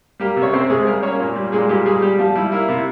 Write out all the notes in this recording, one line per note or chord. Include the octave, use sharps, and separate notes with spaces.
G3 A#3 G4
C3
C#4 C#5
C3 C4 C5
C3 G#3 G#4
G3 A#3 A#4
A#3 C#4 C#5
A#2
G3
A#2 G#3 G#4
A#2 G3 G4
G3 G#3 G#4
G3 G4
F3 G3 F4
G3 E4
A#3 E4
C3 E4